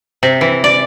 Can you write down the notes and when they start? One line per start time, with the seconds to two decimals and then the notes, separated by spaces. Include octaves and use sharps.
0.23 C3
0.41 E3
0.64 D5